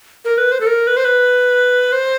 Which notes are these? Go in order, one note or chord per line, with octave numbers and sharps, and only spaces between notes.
A#4
B4
C5
A4
A#4
B4
C5
B4
C5